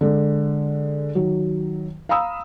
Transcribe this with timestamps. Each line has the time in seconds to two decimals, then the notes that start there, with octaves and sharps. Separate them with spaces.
0.01 D3 G#3
1.15 D#3 F#3
2.09 F5 A#5 B5 D#6 E6